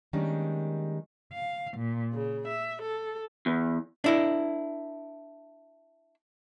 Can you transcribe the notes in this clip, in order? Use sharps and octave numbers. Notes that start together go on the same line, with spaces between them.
D#3 G3 G#3 A#3 C#4 D4
F5
A#2
C#3
E5
A4
E2
D4 E4 A#4